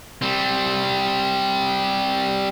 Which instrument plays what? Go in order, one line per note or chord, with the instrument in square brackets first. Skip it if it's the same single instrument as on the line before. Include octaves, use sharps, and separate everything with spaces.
[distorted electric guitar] G3 C4